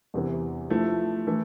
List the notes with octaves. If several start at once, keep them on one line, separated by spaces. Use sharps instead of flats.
E2 C3 E3
F3 A3 E4
E3 A3